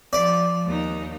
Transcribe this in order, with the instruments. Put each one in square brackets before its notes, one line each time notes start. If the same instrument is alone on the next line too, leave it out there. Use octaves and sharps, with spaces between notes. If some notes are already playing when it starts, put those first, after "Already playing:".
[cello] F3 [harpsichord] D5
[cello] D#2 D#4